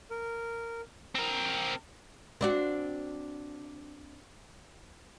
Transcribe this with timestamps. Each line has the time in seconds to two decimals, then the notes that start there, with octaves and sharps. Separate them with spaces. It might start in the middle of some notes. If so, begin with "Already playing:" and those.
0.11 A#4
1.15 C4 A#4
2.41 C4 D4 F#4